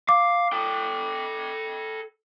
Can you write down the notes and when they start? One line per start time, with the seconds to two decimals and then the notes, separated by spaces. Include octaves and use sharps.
0.09 F5 D6
0.52 A4 G5